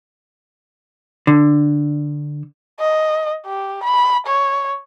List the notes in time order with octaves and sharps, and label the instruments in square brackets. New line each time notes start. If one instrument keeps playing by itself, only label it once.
[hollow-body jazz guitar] D3
[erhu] D#5
G4
B5
C#5